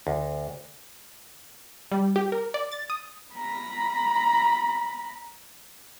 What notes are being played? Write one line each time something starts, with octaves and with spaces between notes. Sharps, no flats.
D2
G3
G4
A#4
D5
A6
D#6
A#5 B5